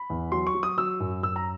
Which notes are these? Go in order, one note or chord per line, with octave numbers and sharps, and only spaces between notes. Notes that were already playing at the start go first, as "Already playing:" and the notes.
Already playing: B5
E2
F#3 C6
C#6
F#3
D#6
F#3 E6
F#2
F#2 E6
A#5